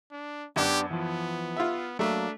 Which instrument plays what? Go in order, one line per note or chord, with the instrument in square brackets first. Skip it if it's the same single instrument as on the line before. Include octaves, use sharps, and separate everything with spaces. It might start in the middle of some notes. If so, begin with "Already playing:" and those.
[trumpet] D4
[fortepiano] F#2 [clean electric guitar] B3 D4 D#4 [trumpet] G4
[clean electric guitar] E3 F3 [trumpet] B3
[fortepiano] F4 E5
[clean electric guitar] F#3 A#3 [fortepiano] A3 [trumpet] D4